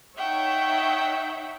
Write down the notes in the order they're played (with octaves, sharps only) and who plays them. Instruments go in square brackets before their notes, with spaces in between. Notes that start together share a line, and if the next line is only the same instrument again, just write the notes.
[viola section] D#4 C#5 E5 [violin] F#5 G5